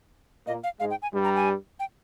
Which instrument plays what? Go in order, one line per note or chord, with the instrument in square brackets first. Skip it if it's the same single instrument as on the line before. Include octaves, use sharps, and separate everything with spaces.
[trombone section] A#2 A#3 [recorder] D#5
[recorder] F5
[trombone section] G#2 G#3 [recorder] F5
[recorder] G5
G#5
[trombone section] G2 G3
[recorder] A#5
G#5
G5